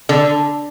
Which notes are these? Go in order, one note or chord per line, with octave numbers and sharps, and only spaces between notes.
D3